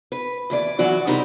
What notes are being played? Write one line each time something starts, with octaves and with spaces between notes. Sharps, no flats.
B4
D#2 E3 D5
E3 F#3 F#4 D5
C3 G3 D#4 E4 A#4